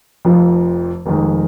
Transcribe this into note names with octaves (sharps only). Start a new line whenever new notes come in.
F1 F2 F3
F1 F2 D#3 G#3